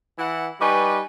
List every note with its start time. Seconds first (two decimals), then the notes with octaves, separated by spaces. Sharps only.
0.19 E3 E4 F#5
0.61 G3 D#4 B4 G#5 C#6 D6